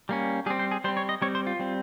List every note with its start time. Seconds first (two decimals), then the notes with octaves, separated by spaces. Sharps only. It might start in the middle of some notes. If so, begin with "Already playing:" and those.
0.09 G3 A#3 C#4
0.46 G3 G#4
0.50 C4
0.59 C5
0.72 G#4
0.84 G3 C5
0.88 C4
0.97 C#5
1.09 D#5
1.22 G3 C4 C#5
1.35 C5
1.47 F4
1.60 G3 C4